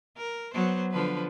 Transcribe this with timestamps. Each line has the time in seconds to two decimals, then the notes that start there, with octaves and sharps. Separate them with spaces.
0.18 A#4
0.54 F#3 B3 C5
0.91 D3 F3 B4